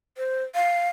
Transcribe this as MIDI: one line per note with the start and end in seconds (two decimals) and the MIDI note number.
0.17 0.44 72
0.55 0.89 77